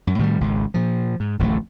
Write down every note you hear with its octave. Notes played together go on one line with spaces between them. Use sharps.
F#2
A2 D#3 F#3 G3
G#1 C#2
A#2 F3
G#2
D1 A1 F2 A3